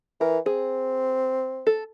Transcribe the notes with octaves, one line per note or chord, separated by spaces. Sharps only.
E3 A#4
C4 G#4
A4